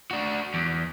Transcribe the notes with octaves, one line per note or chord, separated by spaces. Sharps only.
D4 F#4
E2